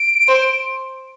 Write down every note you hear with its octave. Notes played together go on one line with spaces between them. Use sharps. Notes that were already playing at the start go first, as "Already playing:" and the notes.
Already playing: D7
C5